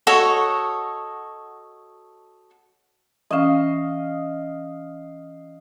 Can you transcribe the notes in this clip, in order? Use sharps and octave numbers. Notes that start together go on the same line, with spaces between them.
F#4 A4 C#5 D#5
E3 C#4 D#5 F5